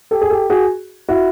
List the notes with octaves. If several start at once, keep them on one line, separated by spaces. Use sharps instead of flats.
G4 A4
G#4
G4 A4
F#4 G#4
E4 F#4